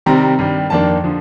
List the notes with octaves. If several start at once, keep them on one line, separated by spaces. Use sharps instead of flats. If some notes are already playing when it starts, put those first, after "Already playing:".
C3 D#3 G3 C4 A#5
G2 D#3 G3
F2 D#3 A#3 D4 A5
D3 F3